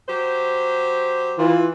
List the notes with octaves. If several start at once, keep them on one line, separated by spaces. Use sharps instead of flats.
F#3 G4 C5
E3 F4